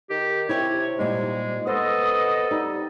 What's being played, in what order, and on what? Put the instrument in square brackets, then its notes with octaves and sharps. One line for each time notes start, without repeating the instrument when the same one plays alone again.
[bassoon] D#3 [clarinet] G4
[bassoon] C3 [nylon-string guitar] E4 G4 [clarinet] C#5
[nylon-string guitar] A#2 G3 D#4 [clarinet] G#3
[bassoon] B3 [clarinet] A4 [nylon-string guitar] C5 [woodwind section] D#5
[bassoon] G3 [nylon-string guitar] D#4